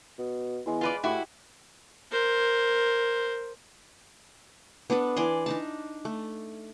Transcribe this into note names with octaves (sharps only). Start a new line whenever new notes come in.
B2
E2 G#3 C6
F4 B4 D5
A2 E4 F#4 G4
A#4 C5
B3 D4 A4 B4
E3 D5 G#5 C6
D4 D#4 A5
A3